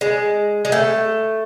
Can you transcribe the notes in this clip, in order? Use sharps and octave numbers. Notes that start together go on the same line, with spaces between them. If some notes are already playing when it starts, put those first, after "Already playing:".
G#3
G#3
A3